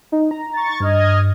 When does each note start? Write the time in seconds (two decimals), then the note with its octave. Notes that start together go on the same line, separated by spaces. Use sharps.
0.12 D#4
0.31 A#5
0.53 C#6 A6
0.80 G2 D#5 F6 G#6